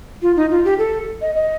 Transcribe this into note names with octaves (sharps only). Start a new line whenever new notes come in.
F4
D#4
F4
G4
A4
D#5
D#5